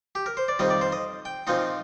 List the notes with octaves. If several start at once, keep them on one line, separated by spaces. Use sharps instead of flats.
G4
A#4
C5
D5
F2 D#3 G3 C4 D#5
D5
C5
D#5
G5
A#2 F3 C4 D#4 D#5